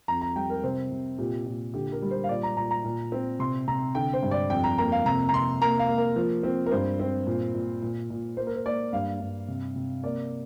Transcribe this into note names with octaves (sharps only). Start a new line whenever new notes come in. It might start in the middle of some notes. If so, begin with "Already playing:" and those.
F2 A#5
A#5
G3 G5
A#4
C3 C5
C3
A#2 G4
A#2
D3 G4
A#4
G3
C5
F5
A#2 D5
A#5
A#2 A#5
A#5
A#2
C4
C3 C6
C3 A#5
D3 G5
C5
G2
D5
F2 G5
A#5
A#3 A#5
F5
C3 A#5
A#5
C3 C6
A#3 A#5
F5
A#3
A#4
F3
C4
A#4
G2 C5
C4
A#2
A#2
A#2
A#2
A#3 C5
A#4
C5
A#3 D5
G2 F5
G2
C3
C3
A#3 D5